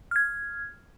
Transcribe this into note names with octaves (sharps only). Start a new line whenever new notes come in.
F6 G#6